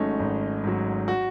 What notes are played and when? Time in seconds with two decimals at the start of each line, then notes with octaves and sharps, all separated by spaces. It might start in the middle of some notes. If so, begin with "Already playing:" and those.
Already playing: G#1 G#2 F#3 G#3 A3 C#4 D#4
0.20 G#1
0.64 G#2 F#3
1.08 F#4